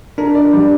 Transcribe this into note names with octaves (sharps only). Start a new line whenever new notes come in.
D4 A#4
D5
G3